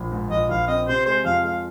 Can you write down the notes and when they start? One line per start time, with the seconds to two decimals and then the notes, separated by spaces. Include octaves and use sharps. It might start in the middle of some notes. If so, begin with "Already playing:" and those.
Already playing: A#1
0.12 G#2
0.30 A#1 D#5
0.49 A#1 F5
0.67 C4 D#5
0.88 C3 C5
1.06 G#3 C5
1.24 F2 F5
1.44 G#3 F5